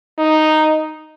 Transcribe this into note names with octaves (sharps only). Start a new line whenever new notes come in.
D#4